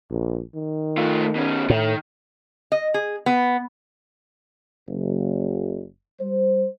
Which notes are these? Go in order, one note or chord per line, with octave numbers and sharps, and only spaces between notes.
A#1
D#3
A3 F4
B2 C#4
A2 D#3
D#5
G#4
B3
F#1
G3 C5